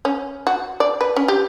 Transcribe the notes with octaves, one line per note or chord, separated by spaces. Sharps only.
C#4
F#4
D5
B4
C#4
G4